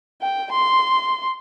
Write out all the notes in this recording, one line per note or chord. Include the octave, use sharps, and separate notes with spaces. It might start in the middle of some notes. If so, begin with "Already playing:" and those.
G5
C6